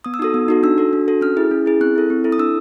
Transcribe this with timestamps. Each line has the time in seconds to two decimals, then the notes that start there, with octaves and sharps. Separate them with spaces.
0.04 B3 D#6
0.14 E6
0.19 D#4 F#4 A4 D#6
0.34 B3
0.48 D#4 F#4 A4
0.63 D4 E6
0.78 F#4 A4
0.93 D4
1.08 F#4 A4
1.21 C#4 F6
1.37 E4 G#4
1.51 C#4
1.66 E4 G#4
1.81 C4 F#6
1.96 E4 A4
2.10 C4
2.24 E4 A4
2.32 D#6
2.38 D4 E6